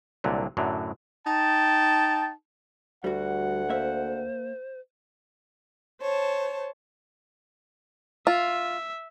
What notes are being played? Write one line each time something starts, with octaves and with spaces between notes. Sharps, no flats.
C2 A#2 D3 F#3
F#2 A2 D3 F#3
D#4 G5 A5
D2 G3 F#4 F#5
A#3 C5 E5
C5 C#5 A5
F4 E5